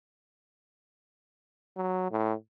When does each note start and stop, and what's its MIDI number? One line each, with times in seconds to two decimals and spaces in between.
1.76 2.11 54
2.11 2.33 45